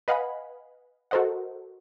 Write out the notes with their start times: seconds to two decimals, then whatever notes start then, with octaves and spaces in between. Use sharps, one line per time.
0.08 B4 D#5 F5 F#5 G#5 B5
1.11 F#4 A4 A#4 C5 D#5 F#5